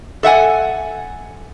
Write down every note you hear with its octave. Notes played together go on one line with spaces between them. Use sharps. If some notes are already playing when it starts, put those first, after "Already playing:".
A4 E5 F#5 G#5